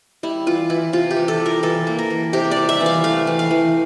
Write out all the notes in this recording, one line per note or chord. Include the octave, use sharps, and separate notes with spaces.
G3 E4
E3 F4
E3 E4
C3 F4
G4
E3
A4
G3
A#4
E3 A4
A#3
A#4
E3
C3 G4
D5
G3
E5
E3
F5
A3 F5
E3
F5
E3